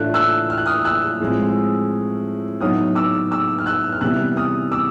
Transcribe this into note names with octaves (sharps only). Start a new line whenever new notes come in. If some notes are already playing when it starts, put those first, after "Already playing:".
Already playing: A2 E3 A3 D4 F4 F#6
E6 F#6
F6
F#6
D#6 F6
E6 F#6
A2 F3 G#3 C4
A2 F#3 B3 D#4 D#6 F6
D6 E6
D6 E6
F6
E6 F#6
F6
C3 E3 G3 B3 E6 F#6
D#6 F6
D6 E6